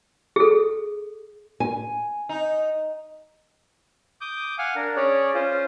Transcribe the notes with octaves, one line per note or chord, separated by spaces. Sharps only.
G#4 A4
G#5
D#4
D6 D#6 G6
F5 F#5 G#5
D4 A#4
C#4 G#4 C#5 D5
C#4 F4 C5